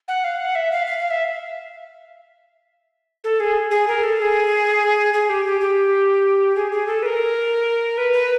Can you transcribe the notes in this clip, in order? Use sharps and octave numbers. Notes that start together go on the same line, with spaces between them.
F#5
F5
F#5
E5
F5
F5
F5
E5
A4
G#4
G#4
A#4
A4
A4
G#4
G#4
G4
G4
G4
G#4
G#4
A4
B4
A#4
B4
B4